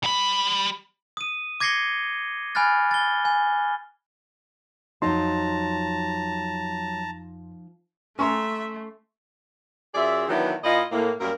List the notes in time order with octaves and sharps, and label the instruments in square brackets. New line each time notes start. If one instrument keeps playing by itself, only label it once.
[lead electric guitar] G3 B5
[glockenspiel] D#6 D#7
D6 G#6 A#6 C7 C#7 G7
G#5 B5 F6 F#6 A6
A6 G7
G#5
[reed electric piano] F2 C6 [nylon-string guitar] F3 D#4 [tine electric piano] F#3 [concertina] A5 A#5
[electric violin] A3 [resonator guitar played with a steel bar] C#4 A#5 [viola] E5 [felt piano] C6 C#6
[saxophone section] F#2 F4 G#4 D5 E5
D#3 E3 F#3 B3 D4 E4
A#2 E4 F4 D#5
A2 A#3
F#2 G3 A#3 A#4